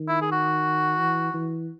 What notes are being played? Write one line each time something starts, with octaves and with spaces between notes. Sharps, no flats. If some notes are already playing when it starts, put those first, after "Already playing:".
Already playing: D#3
E4
G#4
F#4
E3
E3